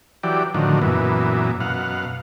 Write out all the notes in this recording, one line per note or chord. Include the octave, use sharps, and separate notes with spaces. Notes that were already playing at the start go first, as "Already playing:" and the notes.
E3 F#3 G4 D5
A2 D3 D#3 F3 F#3
F#2 A#2 E3 B3
F#2 B2 F5 F#5